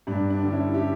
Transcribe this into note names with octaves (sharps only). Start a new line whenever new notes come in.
G2 D4
D4
D3 G3
C#4 E4
E4 G4